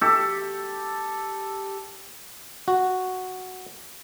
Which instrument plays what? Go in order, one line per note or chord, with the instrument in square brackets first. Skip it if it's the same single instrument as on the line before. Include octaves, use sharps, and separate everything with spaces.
[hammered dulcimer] G4 A4
[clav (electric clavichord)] F#4